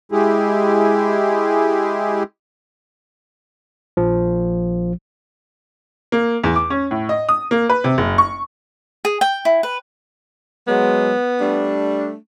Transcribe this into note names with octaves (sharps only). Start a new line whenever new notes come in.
G#3 E4 G4 G#4
A#1 F3
A#3
E2
D6
C#4
A2
D#5
D#6
A#3
B4
C3
F#1
C#6
G#4
G5
E4
B4
F#3 G#3 B3
G3 A3 D4